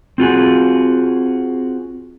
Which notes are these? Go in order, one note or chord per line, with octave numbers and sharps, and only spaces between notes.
C4 F4 F#4 G#4